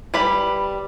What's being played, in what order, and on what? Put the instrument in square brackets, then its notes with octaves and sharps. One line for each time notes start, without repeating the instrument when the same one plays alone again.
[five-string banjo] G3 B4 B5